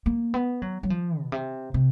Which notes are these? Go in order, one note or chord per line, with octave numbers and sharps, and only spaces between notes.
A#3
B3
F#3
F#3
F3
B2
C3
C3